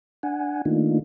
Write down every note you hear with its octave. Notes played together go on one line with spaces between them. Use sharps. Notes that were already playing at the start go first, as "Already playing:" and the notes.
D4 F#5 G#5
D#3 A3 A#3 D4 D#4 F4